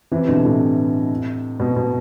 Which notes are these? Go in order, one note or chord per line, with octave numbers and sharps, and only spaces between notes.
C3 E3
B2 D3
A2 C3
B2
B2